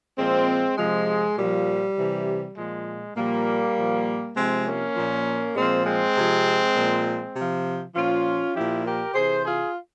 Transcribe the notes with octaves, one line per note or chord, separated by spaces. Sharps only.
A#2 F3 G#3 C4
C3 F3 G#3
A#2 F3 G3
C3 E3
A#2 F3 G#3
A#2 F3 G3 A#3
A#2 F3
C3 F3 G#3 C4
A#3 C#4
A#2 F3
A#2 F3 G#3 C4
G#3 C4
C3 F3
A#2 F3
C3 F3
A#2 F3 C#4 F4
A#2 F3 E4 G4
G4 A#4
C3 E3 G#4 C5
F4 G#4